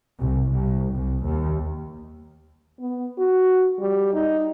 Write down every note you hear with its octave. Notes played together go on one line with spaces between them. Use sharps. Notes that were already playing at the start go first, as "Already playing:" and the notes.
C2
C2
C2
D#2
B3
F#4
G3
D#4